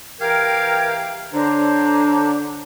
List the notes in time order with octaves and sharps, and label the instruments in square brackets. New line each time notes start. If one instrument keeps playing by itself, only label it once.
[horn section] E3 G4 F5 [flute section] A#4 G5 G#6
[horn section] D3 [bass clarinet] D4 [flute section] C5 C#5 A#5